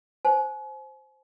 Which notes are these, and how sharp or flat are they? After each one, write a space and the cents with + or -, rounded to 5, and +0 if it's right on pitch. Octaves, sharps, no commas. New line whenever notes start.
C5 +0 G#5 +40